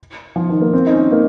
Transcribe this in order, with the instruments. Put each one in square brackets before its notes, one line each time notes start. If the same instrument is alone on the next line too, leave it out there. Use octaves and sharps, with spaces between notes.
[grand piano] F3
D#3
A#3
C4
D#4
C#4
A#3